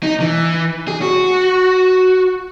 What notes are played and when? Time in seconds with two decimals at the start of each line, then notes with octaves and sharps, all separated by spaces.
0.03 D#4
0.20 E3
0.88 G#4
1.02 F#4